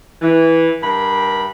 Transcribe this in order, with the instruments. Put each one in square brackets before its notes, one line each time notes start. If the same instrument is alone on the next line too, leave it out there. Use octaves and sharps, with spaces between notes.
[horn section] E3
G2 A#4 B5